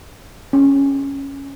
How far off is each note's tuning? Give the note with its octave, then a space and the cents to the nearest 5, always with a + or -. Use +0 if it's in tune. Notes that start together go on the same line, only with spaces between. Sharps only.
C#4 -5